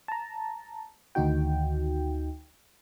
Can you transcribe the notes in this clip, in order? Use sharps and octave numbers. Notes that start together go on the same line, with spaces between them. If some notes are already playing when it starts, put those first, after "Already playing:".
A5 A#5
D2 D#3 D#4 F#4 G5